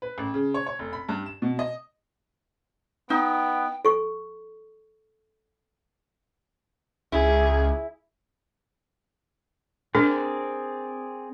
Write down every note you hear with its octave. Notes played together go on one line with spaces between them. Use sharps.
B4
A1
C#3
C#5
C#5
F1
B5
G2
E7
B2
D#5
B3 D#4 G5
A4 C#6
C#2 E4 G#4
C4 D4 G#4 A#4 D5